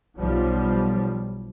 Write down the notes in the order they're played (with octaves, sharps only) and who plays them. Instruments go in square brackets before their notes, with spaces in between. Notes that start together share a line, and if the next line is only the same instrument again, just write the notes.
[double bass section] B1 F3 G3